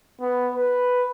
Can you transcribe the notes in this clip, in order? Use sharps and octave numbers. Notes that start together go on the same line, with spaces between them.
B3
B4